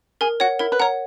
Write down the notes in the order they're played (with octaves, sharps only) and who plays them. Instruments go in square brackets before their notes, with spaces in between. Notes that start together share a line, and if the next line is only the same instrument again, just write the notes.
[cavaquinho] G#4 [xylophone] A#4
[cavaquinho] F#4 [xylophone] C#5 F#5
[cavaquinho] E4 [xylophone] A#4
[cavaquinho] B4
[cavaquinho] A#4 [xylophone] C#5 F#5